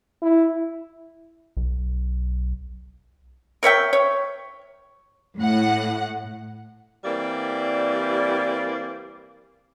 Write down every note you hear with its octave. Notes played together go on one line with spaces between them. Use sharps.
E4
B1
A#4 C#5 E5 G5
C#5
A2 F#5
E3 G3 A#3 C4 D5